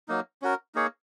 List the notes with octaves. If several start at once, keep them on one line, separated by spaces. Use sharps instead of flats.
F#3 A#3 D#4
C#4 F#4 A#4
A#3 D#4 G#4 C#5